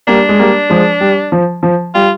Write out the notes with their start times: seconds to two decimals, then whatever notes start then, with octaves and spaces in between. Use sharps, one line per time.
0.07 G3 A#3 D4
0.29 G#3
0.39 G3 A#3
0.70 F3 G#3
1.01 G3
1.32 F3
1.63 F3
1.95 G3 F4